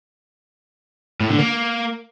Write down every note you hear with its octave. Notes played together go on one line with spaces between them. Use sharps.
A2
D3
A#3